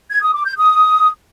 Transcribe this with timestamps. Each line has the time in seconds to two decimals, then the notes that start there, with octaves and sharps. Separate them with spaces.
0.10 G#6
0.22 D#6
0.34 D6
0.45 G6
0.57 D#6